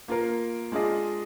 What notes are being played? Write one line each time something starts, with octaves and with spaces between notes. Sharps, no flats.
A#3 F4 A#4
G#3 D4 F4 G#4 D#5